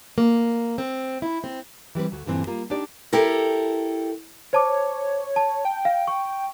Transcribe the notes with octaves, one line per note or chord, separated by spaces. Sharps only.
A#3
C4
E4
C4
E3 G3 C4 B4
D2 F#4
G2 A#2 D3 E3 C4
G3 A#3 F4
D4 D#4 G4 D5
E4 G4 A4 A#4
C5 C#5 A5 D6
A5
G5
F5
C#6